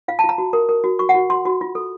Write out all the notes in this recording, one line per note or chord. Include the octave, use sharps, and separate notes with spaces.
F4 F5
A5
F4
A#5
F#4
A#4
A#4
F#4
F#4 C#6
F#5
F#4
F#4 C6
F#4
F4
A4